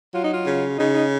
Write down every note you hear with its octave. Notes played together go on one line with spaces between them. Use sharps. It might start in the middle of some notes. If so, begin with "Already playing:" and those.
F#3 F4
D#4
F4
C#3
C#3 D#4
D#4